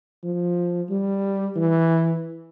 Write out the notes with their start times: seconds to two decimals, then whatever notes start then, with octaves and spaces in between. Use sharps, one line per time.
0.23 F3
0.90 G3
1.56 E3